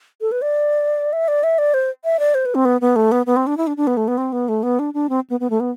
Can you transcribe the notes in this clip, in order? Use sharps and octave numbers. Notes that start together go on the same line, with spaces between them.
A4
B4
D5
E5
D5
E5
D5
C5
E5
D5
C5
B4
C4
B3
B3
A3
B3
B3
C4
D4
E4
D4
D4
B3
A3
B3
C4
B3
A3
B3
D4
D4
C4
B3
B3
A3
B3